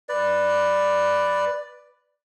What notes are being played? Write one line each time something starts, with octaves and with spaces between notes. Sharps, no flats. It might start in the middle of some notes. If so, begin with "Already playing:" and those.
B4 D5